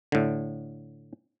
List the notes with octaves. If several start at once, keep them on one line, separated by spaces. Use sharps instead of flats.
A2 D3